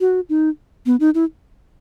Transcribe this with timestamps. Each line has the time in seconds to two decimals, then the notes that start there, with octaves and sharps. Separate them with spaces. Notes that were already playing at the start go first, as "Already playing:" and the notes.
0.01 F#4
0.29 D#4
0.86 B3
1.00 D#4
1.15 E4